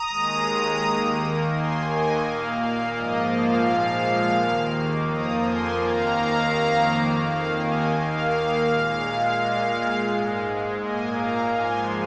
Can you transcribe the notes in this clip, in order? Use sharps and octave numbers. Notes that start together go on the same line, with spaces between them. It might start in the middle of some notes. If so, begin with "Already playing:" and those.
Already playing: A#5 D#6
D#2 D#3 G#3
D#2 D#3 A#3
D#2 D#3 A#3 G#5 C6
D#5 G#5
A#2 A#3 F5
F5
G#2 F3 A#3 D#5
F5
A#2 F3 G#3
D#2 D#3 A#3
F2 F3 A#3 A#5 D#6
G#5 C6
D#2 D#3 A#3 F5 A#5
F2 D#3 A#3
D#2 D#3 A#3 F5
D#5 G#5
D#2 D#3 A#3 F5
A#2 G#3
A#2 G#3
G#2 G#3
A#2 A#3 D#5 G#5
F5 A#5
G#2 F3 G#3 G#5 C6